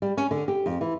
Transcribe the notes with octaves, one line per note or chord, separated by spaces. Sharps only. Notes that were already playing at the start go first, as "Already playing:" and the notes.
G3
C#4
D3
G4
F2
E3